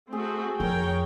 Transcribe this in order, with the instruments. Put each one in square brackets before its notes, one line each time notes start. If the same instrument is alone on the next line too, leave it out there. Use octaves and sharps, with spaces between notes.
[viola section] A3 C4 F#4 [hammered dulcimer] G#4
[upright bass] F2 [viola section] A#4 C#5 G5